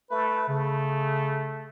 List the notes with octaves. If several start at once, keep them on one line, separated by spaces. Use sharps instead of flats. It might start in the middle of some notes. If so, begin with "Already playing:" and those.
A3 B4
C#3 A3